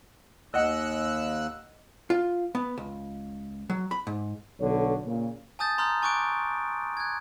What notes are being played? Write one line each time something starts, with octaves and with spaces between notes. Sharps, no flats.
D#2 D#5 F#5 E6 F#6
F4
B3
C#2
F#3
B5
G#2
B1 D3 C#5
A#2 C#3
G#5 A5 D#6 G6 A6
A#5 C6 D#6 F6 G6
G#5 C#6 D6 F#6 G6 D7
F#6 G#6